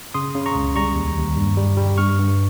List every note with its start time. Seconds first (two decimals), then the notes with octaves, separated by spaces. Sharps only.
0.14 C#3 C6 D#6
0.35 C#3
0.46 A#5 C#6
0.55 C#2
0.76 G3 A#5 C#6
0.96 D#2
1.17 D#2
1.37 G2
1.57 G3
1.77 G3
1.97 G2 C#6 F6
2.19 G2